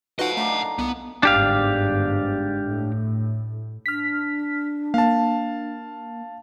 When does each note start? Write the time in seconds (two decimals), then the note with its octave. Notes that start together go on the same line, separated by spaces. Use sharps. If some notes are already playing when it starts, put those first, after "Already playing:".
0.19 F3 F#3 A3 D#4 F#4 B4 D#5 F#5
0.37 A3 A#3 D4 D#4
0.79 C2 B3
1.23 G1 G#2 D4 G4 F5
2.66 A2
3.86 D4 F6 B6
4.94 A#3 F5 A5